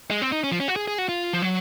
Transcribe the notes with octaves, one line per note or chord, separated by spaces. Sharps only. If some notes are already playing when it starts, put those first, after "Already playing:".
G#3
C4
D#4
C#4
F3
C#4
F#4
G#4
G#4
F#4
F4
F3
F#3